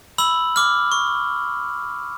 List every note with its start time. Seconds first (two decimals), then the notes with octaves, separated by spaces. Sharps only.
0.18 B5 E6 F#7
0.56 D6 F6
0.92 C#6